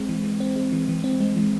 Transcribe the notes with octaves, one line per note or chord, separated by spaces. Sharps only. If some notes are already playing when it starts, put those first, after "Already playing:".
Already playing: G#3 C4
E3
E3
C4
G#3
E3
E3
C4
G#3
E3